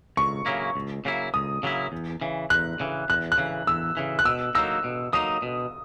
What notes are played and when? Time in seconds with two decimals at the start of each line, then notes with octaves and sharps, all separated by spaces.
0.17 C#2 C#6
0.46 C#3 F#3 A#3 E4
0.75 C#2
1.05 C#3 F#3 A#3 E4
1.34 C#2 D#6
1.63 C#3 F#3 A#3 E4
1.92 E2
2.21 C#3 E3
2.50 E2 F#6
2.80 C#3 E3
3.10 E2 F#6
3.32 F#6
3.38 C#3 E3
3.67 E2 E6
3.97 C#3 E3
4.19 F#6
4.25 B2 E6
4.55 F#3 A#3 D#4 E6
4.84 B2
5.13 F#3 A#3 D#4 D#6
5.42 B2